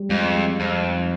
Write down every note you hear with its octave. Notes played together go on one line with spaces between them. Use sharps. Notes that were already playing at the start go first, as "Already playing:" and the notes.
Already playing: G3
F2 G#3
G#3
F2 C4
D#4